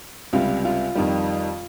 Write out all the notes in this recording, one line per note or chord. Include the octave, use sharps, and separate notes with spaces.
C#2 C3 G3 F4
F4
F2 D#3 G3